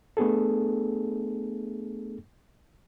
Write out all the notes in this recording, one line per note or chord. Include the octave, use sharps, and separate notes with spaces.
A3 B3 D4 G#4 A4